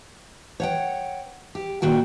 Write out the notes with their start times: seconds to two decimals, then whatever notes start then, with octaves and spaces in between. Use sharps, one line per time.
0.60 C#5 F#5 G5
1.55 G4
1.82 A#2 D#3 F#4 G5